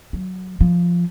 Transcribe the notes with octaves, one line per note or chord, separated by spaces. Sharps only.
F#3
F3